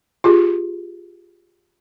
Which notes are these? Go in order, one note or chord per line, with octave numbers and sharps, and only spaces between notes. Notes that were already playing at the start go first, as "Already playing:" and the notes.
F4 G4 G#4